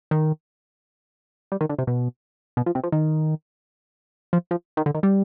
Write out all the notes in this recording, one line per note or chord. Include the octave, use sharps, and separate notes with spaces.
D#3
G3
D#3
D3
C3
B2
B2
F3
C3
F3
D#3
F3
F3
D#3
D3
D#3
G3